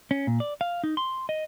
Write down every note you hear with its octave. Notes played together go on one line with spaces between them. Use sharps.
C#4
A#2
D5
F5
D#4
C6
D#5